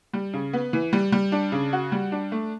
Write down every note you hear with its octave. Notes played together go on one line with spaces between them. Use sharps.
G3
C#3
B3
E3
G3
G3
D4
C#3
F#4
G3
D4
A3